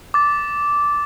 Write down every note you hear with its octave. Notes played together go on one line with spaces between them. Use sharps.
D6 A6